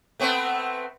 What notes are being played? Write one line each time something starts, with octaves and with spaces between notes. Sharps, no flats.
A3 B3 C4